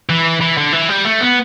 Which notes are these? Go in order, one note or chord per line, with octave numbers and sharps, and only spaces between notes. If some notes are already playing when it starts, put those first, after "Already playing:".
E3
E3
D3
E3
G3
A3
B3